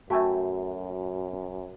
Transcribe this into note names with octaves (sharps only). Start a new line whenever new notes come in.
F#2 A3 F#4 E5 G5 G#5